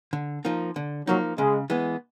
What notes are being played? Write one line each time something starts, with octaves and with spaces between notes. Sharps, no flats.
D3
F3 A#3 D#4
D3
F3 F#3 A#3 D#4
C#3 G#3
E3 G#3 B3